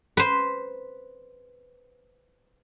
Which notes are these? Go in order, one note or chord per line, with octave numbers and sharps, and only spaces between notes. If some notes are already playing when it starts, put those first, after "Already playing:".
B4 C5